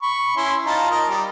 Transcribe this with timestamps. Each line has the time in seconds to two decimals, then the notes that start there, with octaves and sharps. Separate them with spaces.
0.02 B5 C#6
0.36 C#4 E4 C6
0.66 D#4 F4 A5
0.91 A#4 D#5
1.09 G3